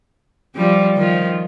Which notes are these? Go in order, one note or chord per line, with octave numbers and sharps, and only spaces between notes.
F3 G3
D#3 F3